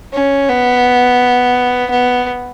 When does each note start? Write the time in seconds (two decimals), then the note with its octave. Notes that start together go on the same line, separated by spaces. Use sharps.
0.13 C#4
0.49 B3
1.90 B3